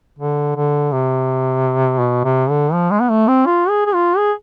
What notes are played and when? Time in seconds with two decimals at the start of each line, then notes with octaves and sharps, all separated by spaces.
0.19 D3
0.56 D3
0.92 C3
2.00 B2
2.24 C3
2.50 D3
2.73 F3
2.91 G#3
3.01 B3
3.10 A3
3.28 C4
3.46 F4
3.69 G#4
3.86 G#4
3.95 F4
4.18 G#4